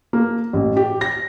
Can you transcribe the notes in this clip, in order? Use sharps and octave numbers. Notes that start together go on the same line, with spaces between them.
A#3
A1
G4
A#6